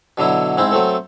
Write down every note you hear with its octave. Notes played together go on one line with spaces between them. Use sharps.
B2 D3 F#3 E4
G#2 C4 E4
F#3 A3 C4 A4